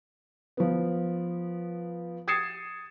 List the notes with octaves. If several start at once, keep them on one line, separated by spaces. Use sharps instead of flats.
F3 B3
D#6 G#6 A6 C7 C#7 E7